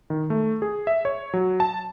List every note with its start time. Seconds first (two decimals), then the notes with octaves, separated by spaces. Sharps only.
0.10 D#3
0.30 A3
0.62 G#4
0.87 E5
1.05 C#5
1.34 F#3
1.60 A5